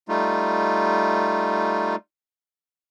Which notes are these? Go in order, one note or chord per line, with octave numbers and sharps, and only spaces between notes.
G3 A3 D#4 F4